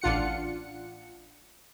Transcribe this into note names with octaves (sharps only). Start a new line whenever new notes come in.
A1 D4 F4 F#5 C#7